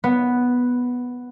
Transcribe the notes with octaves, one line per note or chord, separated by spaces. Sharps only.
B3